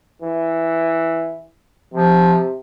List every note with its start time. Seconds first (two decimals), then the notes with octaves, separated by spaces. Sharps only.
0.22 E3
1.93 C3 F3